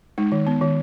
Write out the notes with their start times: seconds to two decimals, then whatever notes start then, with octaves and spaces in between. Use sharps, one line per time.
0.18 G#3 D#4
0.32 D#3
0.47 B3
0.62 D#3